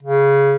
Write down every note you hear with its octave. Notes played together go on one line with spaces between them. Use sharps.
C#3